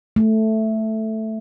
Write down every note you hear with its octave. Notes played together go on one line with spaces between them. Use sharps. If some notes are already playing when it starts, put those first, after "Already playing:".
A3